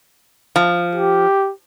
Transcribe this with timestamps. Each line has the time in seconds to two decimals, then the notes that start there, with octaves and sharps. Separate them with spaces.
0.56 F3
0.95 G4